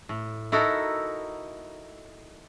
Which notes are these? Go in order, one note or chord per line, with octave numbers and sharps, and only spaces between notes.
A2
D#4 E4 F#4 A4 A#4